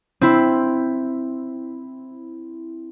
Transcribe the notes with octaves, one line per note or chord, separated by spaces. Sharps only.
C4 E4